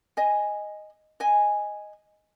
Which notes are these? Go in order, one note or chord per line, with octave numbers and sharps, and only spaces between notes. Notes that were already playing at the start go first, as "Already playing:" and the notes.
D#5 G#5
D#5 G#5